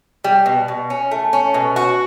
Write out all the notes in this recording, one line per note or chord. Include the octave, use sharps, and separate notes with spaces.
G3
B2
B2
C#4
A3
C#4
B2
F#4